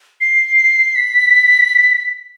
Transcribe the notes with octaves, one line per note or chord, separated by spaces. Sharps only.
C7
B6